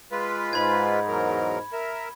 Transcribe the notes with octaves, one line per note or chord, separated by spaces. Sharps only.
G#3 F4 B4
G#2 B5 G#6
E2 F#3 A#4
A#4 E5